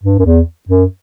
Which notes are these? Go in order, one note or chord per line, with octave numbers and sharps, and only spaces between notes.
G2
F#2
E2
F#2